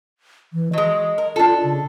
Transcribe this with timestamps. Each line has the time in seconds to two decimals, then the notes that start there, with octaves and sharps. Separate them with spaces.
0.53 E3
0.73 F#3 G#3 D#5
1.18 A#4
1.36 D4 F4 A4
1.63 C#3